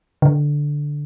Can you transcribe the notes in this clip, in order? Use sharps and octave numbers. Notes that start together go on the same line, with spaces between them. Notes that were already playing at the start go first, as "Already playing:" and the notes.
D3